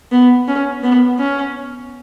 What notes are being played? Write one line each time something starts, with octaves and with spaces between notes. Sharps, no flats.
B3
C#4
B3
C#4